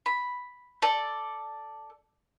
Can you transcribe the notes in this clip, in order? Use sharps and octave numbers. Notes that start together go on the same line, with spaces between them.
B5
A4 D5